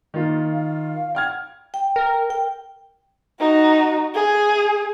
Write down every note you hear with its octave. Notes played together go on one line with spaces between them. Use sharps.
D#3 A#3 F4
F5
F#5 G5 F6 G#6
G5
A#4
G5
D#4 F#4
G#4